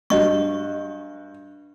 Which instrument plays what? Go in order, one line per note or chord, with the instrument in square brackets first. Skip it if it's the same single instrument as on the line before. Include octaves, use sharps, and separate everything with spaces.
[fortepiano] G2 F#4 [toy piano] D#5 C#6